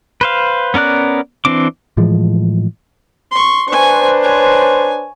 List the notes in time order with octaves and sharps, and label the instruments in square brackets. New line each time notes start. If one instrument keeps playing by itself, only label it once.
[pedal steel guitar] B4 C5 F5
B3 C#4 A#4 D5 F#6
E3 C4 D4 D6
[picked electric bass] A2 E3 F3 G#3
[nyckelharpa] C6 C#6
[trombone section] D4 B4 C5 [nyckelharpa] G#5 C#6
[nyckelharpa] C#5 G#5